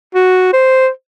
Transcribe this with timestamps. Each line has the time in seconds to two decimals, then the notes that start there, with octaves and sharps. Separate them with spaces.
0.14 F#4
0.53 C5